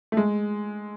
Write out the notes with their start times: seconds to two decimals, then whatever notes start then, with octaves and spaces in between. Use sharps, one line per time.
0.12 A3
0.17 G#3